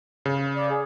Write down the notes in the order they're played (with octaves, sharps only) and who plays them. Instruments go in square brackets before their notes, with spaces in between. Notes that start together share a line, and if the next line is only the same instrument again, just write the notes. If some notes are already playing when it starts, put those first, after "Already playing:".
[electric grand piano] C#3
[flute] D5
G#4